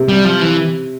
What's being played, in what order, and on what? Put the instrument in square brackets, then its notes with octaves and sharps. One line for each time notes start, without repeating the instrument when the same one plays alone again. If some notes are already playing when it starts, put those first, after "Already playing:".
Already playing: [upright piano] C3
[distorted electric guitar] G3
F3
E3